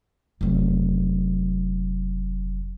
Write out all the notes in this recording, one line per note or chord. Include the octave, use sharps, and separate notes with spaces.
F1 F#3